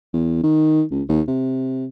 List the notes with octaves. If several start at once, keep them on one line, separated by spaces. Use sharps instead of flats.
E2
D#3
C#2
D#2
C3